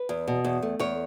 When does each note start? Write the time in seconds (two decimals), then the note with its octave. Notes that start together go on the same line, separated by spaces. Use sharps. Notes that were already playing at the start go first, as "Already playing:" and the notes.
Already playing: B4
0.09 E2
0.27 B2
0.45 E2
0.62 A3
0.79 E2 C#5